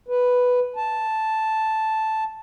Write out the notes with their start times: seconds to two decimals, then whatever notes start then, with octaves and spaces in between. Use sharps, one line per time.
0.08 B4
0.76 A5